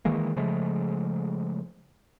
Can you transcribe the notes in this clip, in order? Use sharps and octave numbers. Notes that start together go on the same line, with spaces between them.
D#3 E3 G#3 A#3
C#3 F3 G#3 A3